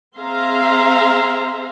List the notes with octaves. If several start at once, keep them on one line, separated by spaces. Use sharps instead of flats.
C4 G#4 E5 F5 A#5 C6